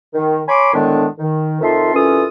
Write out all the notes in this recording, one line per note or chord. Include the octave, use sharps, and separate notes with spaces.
D#3
C#5 G#5 B5 C6 D6
A2 D3 D#3 G#3 B3 D4
D#3
F2 D#3 F4 E5 A5 C6
C2 E3 C#4 F4 A4 D#6